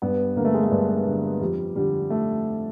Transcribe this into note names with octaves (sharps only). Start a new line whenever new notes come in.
G2 B3
D3 A#3
A3
G#3
A3
G2
D3
F2 G3
D3 G3
A3